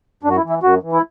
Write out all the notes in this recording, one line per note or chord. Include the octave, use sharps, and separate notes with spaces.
F#2 D4
F#4
E4
E3
E4
F#2 F#4
E3
E4